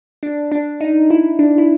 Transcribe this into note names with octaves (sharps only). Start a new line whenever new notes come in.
D4
D4
D#4
E4
D4
E4